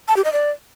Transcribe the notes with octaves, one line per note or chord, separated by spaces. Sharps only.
A5
G4
D#5
D5